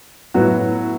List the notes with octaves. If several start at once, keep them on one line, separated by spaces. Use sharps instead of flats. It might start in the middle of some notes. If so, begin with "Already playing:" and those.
A2 F#3 B3 F#4